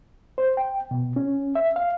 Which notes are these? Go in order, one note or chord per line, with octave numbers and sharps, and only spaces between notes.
C5
G5
B2
C#4
E5
F5